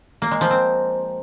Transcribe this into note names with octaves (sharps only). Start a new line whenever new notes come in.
A#3
G#3
F3
C4